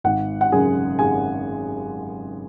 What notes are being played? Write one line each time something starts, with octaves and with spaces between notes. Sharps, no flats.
G#1 F#5
F#5
F#2 C#3 G#4 G#5
G#1 G#4 G#5